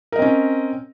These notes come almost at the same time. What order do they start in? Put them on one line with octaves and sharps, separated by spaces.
A#4 D#5 C4 C#4